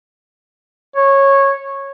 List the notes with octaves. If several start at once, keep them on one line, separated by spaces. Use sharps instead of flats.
C#5